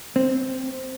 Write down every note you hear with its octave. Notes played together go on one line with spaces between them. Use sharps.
C4